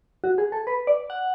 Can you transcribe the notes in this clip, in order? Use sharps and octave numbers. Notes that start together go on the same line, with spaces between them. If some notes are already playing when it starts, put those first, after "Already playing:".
F#4
G#4
A4
B4
D5
F#5